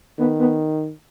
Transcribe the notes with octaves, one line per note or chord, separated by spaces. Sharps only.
D#3 B3
B3